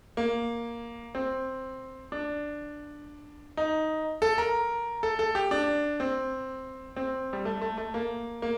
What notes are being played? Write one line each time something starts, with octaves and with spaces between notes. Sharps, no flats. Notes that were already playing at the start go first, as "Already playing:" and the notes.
A#3
C4
D4
D#4
A4
A#4
A4
A4
G4
D4
C4
C4
G3
A3
A3
A3
A#3
A#3